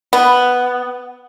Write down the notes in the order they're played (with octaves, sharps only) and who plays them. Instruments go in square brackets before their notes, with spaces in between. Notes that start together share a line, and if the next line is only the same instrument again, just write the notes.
[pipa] B3